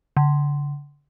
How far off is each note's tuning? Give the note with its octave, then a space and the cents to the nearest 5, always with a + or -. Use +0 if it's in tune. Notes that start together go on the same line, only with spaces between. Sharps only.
D3 -35